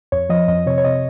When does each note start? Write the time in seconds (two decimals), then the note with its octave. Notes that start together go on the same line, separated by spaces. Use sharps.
0.12 F2 C#5
0.29 F3 D#5
0.48 F2 D#5
0.66 C3 C#5
0.78 C#5
0.84 C3 D#5